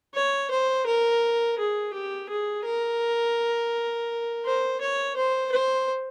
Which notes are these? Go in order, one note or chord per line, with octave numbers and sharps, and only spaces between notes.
C#5
C5
A#4
G#4
G4
G#4
A#4
C5
C#5
C5
C5